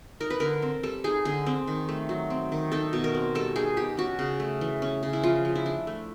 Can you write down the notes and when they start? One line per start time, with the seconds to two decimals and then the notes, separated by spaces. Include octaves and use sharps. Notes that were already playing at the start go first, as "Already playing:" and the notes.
0.20 D#4 A#4
0.30 B4
0.40 D3 A#4
0.62 C4
0.83 G3 A4
1.04 D#4 G#4
1.25 D3 G#4
1.46 C4
1.67 D#3
1.89 A3
2.09 F#3
2.30 C4
2.52 D#3
2.72 D#4 A4
2.93 B2
3.04 A#4
3.14 C4
3.35 G3 A4
3.56 D#4 G#4
3.77 B2 G4
3.97 C#4 F#4
4.19 C#3
4.40 A3
4.61 E3
4.82 C#4
5.03 C#3
5.13 E4
5.23 F3 F4
5.45 F3
5.55 E4
5.66 D4
5.87 A3